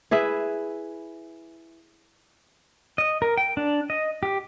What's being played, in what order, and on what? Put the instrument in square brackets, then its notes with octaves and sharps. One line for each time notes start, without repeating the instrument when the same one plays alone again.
[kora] E4 G#4 B4 E5
[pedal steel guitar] D#5
A#4
G5
D4
D#5
G4